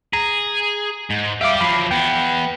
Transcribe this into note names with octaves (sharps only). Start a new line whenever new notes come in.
G#4 A#5
G#2
G4 D5 E5 F5 D6
F3 F#3 B5 C7
E2 B3 G5